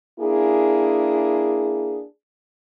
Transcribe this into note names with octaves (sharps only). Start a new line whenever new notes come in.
A#3 D4 E4 G#4